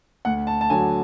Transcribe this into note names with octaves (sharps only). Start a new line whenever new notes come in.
D2 F#5
A5
A5
D3 F#3 G#5